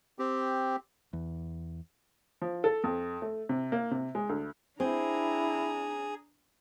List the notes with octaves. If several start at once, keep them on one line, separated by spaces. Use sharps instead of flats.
C4 G4
E2
F3
A4
F2
A3
C3
A#3
C3
G#3
D2
C4 D4 E4 G#4 A#5